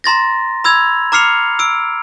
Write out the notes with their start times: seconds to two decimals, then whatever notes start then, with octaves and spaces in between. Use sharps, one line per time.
0.04 A#5 C6 A6 A#6
0.64 B5 E6 G#6 F7
1.12 A#5 D6 F6 C7 C#7 F7
1.59 E6 D7